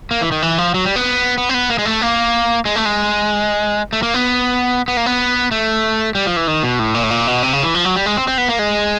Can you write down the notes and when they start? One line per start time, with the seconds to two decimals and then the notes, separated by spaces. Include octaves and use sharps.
0.11 A#3
0.21 E3
0.32 D#3
0.42 E3
0.58 F3
0.74 F#3
0.85 G3
0.96 B3
1.38 B3
1.49 C4
1.54 B3
1.70 A#3
1.78 G#3
1.85 A3
2.01 A#3
2.65 G#3
2.76 A3
2.85 G#3
3.93 A3
4.03 A#3
4.14 B3
4.88 B3
4.97 A#3
5.06 B3
5.51 A3
6.15 G3
6.26 F3
6.36 E3
6.48 D#3
6.63 B2
6.79 A2
6.94 A#2
7.03 A2
7.11 A#2
7.27 B2
7.43 C3
7.53 C#3
7.63 E3
7.74 F3
7.85 F#3
7.96 G3
8.06 G#3
8.17 C4
8.28 C4
8.38 B3
8.48 A#3
8.59 G#3